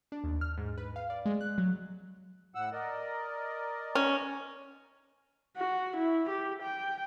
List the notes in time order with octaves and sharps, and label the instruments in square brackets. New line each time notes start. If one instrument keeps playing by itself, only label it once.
[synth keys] D4
D#2
F6
G#2
B4
F5
D5
G#3
F#6
F#3
[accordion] A2 F#5 E6
A#4 D5 D#5
[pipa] C#4
[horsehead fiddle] F#4
E4
G4
G5